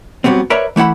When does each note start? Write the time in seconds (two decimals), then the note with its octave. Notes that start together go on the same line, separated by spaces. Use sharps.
0.24 F#2 F#3 G3 B3 C4
0.50 A#4 B4 C#5 D5 E5 A#5
0.76 E3 A3 E4 F#5 B5